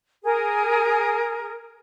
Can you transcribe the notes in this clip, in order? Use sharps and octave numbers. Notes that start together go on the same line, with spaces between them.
G#4 A#4